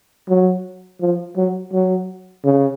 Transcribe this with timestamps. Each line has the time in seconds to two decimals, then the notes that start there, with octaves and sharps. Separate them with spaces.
0.29 F#3
1.01 F3
1.37 F#3
1.73 F#3
2.45 C#3